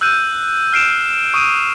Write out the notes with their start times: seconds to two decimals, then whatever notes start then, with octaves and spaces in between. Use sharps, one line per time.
0.01 E6 F#6 G6 D#7
0.73 F6 C7 D7 E7
1.34 C#6 D#6 D7 D#7